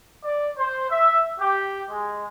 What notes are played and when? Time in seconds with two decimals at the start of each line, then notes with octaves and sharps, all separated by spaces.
0.24 D5
0.57 C5
0.90 E5
1.40 G4
1.90 G#3